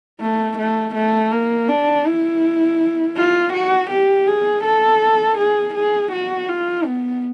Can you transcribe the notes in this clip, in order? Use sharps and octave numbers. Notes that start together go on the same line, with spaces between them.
A3
A3
A3
A#3
D4
E4
F4
F#4
G4
G#4
A4
G#4
G#4
F#4
F4
B3